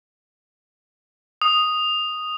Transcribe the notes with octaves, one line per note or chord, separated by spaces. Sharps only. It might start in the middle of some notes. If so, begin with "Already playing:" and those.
D#6